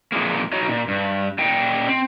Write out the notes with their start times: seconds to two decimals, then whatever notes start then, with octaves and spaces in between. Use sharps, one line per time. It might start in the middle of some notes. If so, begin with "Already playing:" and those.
0.12 F2 A#2 G#3 A#3
0.52 D#4 F#4 C#5 D#5
0.69 A#2
0.88 G2
1.39 A#2 D#5 G5
1.88 C4